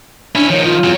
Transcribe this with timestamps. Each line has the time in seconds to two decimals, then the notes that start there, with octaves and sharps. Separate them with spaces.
0.35 C#4 D4 E4
0.49 D#3 F3 C#5
0.64 F4
0.84 E2 F#3